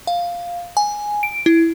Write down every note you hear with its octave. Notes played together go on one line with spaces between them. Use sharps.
F5
G#5
D7
E4